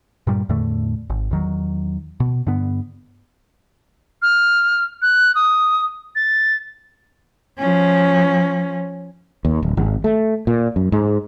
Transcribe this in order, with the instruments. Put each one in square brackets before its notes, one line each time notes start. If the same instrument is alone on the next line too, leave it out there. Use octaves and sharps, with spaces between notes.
[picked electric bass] G2 A#2 G3
E2 A2 D3 A3
G#1
E2 D#3 F#3
B2
G2 D3 B3
[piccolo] F6
F#6
D#6
A6
[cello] F3 C#4
[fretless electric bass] D#2
D1
G#1
A3
A#2
F#2
G#2